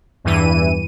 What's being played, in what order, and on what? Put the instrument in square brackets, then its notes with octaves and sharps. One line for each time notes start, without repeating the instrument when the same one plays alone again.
[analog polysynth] E2 G2 E3 D#7